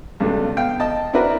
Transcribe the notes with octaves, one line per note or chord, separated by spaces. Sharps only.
C#2 G2 B2 A3
B3 F5 G5
D#5 A5
C4 D4 E4 F#4 A#4 B4